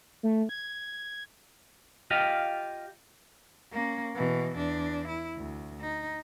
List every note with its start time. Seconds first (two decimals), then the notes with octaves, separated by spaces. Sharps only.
0.23 A3
0.49 G#6
2.11 F4 G4 D#5 F5
3.72 A#3 C#4
4.15 B2 E3
4.57 E2 D4
5.08 E4
5.37 D2
5.81 D#4